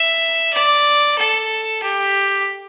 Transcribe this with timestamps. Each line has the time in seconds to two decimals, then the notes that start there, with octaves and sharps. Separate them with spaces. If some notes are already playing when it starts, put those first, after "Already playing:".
Already playing: E5
0.53 D5
1.18 A4
1.83 G4